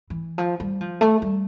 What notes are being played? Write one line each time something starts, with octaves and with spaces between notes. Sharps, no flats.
E3
F3
G3
F3
A3
G3